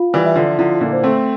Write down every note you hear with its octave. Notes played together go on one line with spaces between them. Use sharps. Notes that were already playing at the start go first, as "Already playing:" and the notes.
Already playing: F4 F5
E3 G3
E5
D3 F3
D3 F3 E4
A#2 D3
C5
A3 C4